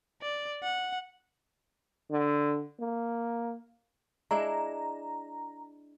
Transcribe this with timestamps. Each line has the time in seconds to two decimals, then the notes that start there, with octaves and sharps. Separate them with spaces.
0.22 D5
0.63 F#5
2.11 D3
2.80 A#3
4.31 G#3 D4 E4 A#5